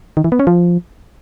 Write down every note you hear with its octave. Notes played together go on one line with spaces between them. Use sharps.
D#3
E3
B3
C#4
F3